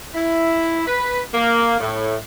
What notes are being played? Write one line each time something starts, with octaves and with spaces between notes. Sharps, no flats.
E4
B4
A#3
A2